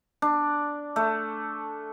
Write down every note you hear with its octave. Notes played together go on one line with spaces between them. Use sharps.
D4
A3